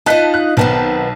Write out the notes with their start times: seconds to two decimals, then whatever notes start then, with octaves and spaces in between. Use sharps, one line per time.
0.06 D#4 F4 D#5 A5 F#6 B6
0.34 F#6
0.57 B1 D#3 B3 C4 A5